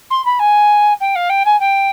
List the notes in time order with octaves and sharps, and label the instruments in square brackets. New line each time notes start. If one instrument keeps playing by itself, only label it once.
[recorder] C6
B5
G#5
G5
F5
G5
G#5
G5